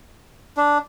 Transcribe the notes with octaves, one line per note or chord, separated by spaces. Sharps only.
D4